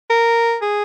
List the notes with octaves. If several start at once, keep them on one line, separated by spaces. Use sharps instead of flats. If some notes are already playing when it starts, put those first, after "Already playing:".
A#4
G#4